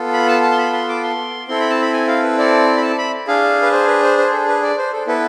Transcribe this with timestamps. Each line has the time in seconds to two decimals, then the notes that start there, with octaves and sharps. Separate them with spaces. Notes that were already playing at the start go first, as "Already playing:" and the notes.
Already playing: B3 F4 A4
0.13 B5
0.28 A5
0.43 A5
0.52 C6
0.58 B5
0.73 C6
0.89 D6
1.03 C6
1.48 C4 E4 A4 C6
1.60 B5
1.70 A5
1.82 B5
1.93 G#5
2.08 F5
2.23 B4
2.38 D5
2.77 B5
2.82 A5
2.98 B5
3.28 D4 G#4 F5
3.62 B4
3.72 C5
3.87 B4
4.03 C5
4.18 C5
4.33 A4
4.48 B4
4.62 D5
4.78 C5
4.92 A4
5.07 B3 E4 A4 B4